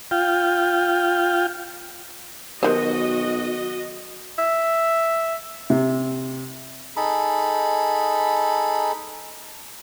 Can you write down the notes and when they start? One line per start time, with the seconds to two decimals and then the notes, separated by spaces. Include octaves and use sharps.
0.11 F4 G5
2.63 B1 D#3 F#4 G4 A#4 C5 D#5
4.39 E5
5.70 C3
6.97 D#4 G#4 A4 B5